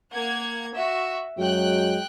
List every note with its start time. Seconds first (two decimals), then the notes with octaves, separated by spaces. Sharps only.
0.12 A#3 F#5 G#6
0.73 F#4 E5
1.38 F#2 F#3 G#3 G5 F#6